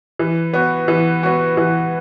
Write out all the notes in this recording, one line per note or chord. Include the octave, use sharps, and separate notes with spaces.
E3
B3 F#4
E3
B3 F#4
E3